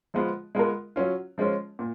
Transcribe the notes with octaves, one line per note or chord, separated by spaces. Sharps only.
F3 G#3 B3 F4
G#3 B3 F4 A#4
F#3 C#4 F4
F3 G#3 C#4 F4
A#2